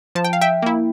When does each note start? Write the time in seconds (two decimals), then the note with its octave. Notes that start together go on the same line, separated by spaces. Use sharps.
0.15 F3 A5
0.25 G5
0.33 F5
0.41 E5 G5
0.62 A#3 E4